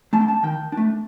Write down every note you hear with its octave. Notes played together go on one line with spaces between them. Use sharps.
A3 D4 A5
G5
A5
D#3 G5
D4
A3